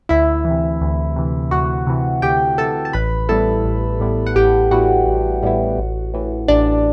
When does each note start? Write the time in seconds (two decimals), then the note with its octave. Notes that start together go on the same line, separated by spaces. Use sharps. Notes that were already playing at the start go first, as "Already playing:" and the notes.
0.09 D2 E4 E5
0.45 E3
0.50 C3
0.81 D2
1.16 C3 E3
1.51 D2 F#4 F#5
1.87 C3 E3
2.22 D2 G4 G5
2.58 C3 E3 A4 A5
2.85 A5
2.93 A1 B4 B5
3.29 A2 G3 B3 E4 A4 A5
3.64 A1
4.00 A2 G3 B3 E4
4.27 F#5
4.36 A1 G4 G5
4.71 A2 G3 B3 E4 F#4 F#5
5.06 A1
5.43 A2 G3 B3 E4
5.78 A1
6.14 A2 E3
6.48 A1 D4 D5